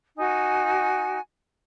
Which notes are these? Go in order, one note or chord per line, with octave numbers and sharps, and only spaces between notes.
D#4 F#4 G#5